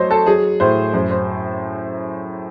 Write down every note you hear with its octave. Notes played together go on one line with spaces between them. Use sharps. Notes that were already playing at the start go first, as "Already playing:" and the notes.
Already playing: F#3 A3 C5 C#5 D#5
A4
F#3 G#4
A2 C5
F#2 C5
C5